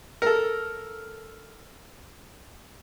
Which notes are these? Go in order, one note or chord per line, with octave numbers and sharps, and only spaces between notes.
A4 A#4